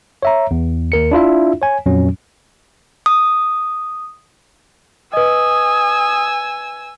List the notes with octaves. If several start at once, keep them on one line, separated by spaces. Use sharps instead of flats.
C#5 E5 A#5
E2
D#2 A#4 C#7
D4 E4 F4 E5
C#5 G#5
F2 A#2 F#3 C#4
D#6
B4 D#5 G#5 D#6 E6